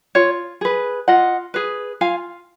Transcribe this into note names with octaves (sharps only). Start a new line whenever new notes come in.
F4 C#5
G#4 B4
F4 D#5 F#5
G#4 B4
F4 F5 G#5